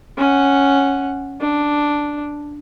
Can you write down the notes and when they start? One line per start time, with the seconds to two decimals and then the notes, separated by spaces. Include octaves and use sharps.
0.18 C#4 F#5
1.41 D4